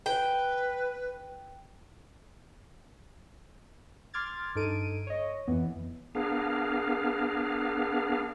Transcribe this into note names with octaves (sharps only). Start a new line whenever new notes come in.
B4 G5
C6 D6 F6 G#6 A6
G2 D#4 A4 D7 D#7
C#5 D#5
F2 E3 B3
B3 D4 G#4 A#4 F5